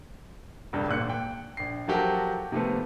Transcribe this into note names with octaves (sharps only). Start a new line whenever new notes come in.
E1 C#2 G2
G#1 A#2 F#6 C#7
G5
A#1 C7
F3 F#3 F#4 G4 A4 A#4
C3 D#3 F3 A3 B3